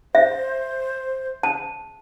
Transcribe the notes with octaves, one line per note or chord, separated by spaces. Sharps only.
C5 E5
A5